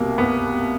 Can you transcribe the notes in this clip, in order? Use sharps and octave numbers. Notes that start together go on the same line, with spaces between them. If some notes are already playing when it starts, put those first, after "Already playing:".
Already playing: C2 B2 A#3
B3